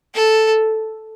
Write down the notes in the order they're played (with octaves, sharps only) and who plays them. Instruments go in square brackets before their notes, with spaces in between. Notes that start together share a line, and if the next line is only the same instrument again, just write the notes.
[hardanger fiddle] A4